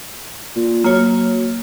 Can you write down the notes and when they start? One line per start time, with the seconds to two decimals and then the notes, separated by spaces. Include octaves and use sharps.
0.55 A#2
0.84 F#3 A#3 C#5